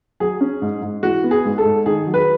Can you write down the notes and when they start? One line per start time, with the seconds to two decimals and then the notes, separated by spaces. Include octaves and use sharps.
0.20 F#3 G#4
0.41 C#4
0.62 G#2
0.82 G#2
1.03 E3 F#4
1.24 B3
1.31 G#4
1.45 G#2
1.58 A4
1.65 G#2
1.86 D#3 G#4
2.07 F#3
2.14 B4